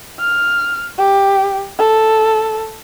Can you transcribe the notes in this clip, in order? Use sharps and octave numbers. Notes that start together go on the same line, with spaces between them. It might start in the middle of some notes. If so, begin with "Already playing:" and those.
F6
G4
A4